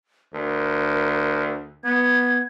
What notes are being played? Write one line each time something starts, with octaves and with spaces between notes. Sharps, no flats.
D2 A#4
B3 G#6